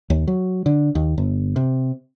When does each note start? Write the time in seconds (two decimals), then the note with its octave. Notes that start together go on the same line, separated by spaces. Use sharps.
0.10 D#2
0.27 F#3
0.66 D3
0.95 D#2
1.18 G1
1.56 C3